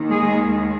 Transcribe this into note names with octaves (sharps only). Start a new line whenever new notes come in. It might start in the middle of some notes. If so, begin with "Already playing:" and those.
Already playing: D#2 D#3
G#3 G#4